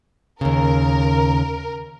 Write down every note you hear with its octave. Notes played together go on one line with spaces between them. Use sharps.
D#2 C#3 A#4